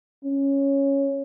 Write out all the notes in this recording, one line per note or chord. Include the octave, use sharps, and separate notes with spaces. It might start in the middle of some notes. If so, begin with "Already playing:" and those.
C#4